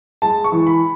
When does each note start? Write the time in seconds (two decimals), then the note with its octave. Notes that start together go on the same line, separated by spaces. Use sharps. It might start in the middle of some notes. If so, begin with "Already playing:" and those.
0.22 G#3 A5
0.44 C#6
0.52 E3
0.67 B5